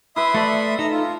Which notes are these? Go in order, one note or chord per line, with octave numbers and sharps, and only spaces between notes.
E4 B4 E5 B5 C6 D#6
A3 D5 F5 A5 C#6
D#4 A4 E5 A#5
F4